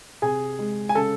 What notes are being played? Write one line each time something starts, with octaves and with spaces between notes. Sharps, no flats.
C3 G#4 G#5
G#3
G#5
C#3 A4 A5